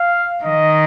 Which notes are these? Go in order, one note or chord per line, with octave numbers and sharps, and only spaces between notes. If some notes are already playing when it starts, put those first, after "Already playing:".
Already playing: F5
D#3 D#5